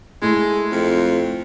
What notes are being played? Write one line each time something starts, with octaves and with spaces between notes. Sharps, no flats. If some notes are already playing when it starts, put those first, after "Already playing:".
G#3 A3 E4
F2